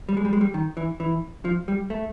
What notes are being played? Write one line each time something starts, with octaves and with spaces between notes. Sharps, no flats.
G3
G#3
G3
G#3
G3
D#3
E3
E3
F3
G3
A3